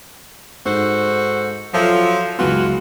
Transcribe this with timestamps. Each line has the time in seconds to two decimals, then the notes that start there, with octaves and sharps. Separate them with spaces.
0.66 G#2 F#4 A4 C5
1.74 F3 F#3 F4 A4 E5
2.38 C#2 E3 F#3 B3 F4 F#4